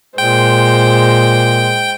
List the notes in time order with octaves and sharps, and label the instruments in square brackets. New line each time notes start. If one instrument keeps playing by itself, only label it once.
[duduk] A#2 [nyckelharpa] G#3 C5 [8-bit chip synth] G5